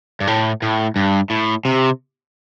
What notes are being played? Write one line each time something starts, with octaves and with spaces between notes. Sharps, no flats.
G2
A2
A2
G2
A2
C3